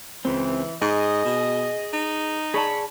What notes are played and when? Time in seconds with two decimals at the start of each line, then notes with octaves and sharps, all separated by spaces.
0.25 C#2 E3 C4
0.82 G#2 G#4 D#5
1.25 B2
1.93 D#4
2.54 G#4 C#5 D5 A5 B5